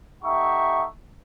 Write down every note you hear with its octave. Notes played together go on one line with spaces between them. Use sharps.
A3 D#4 G4 E5 F#5 C#6